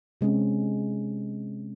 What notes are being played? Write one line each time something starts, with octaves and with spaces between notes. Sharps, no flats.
C3 G#3 C4 C#4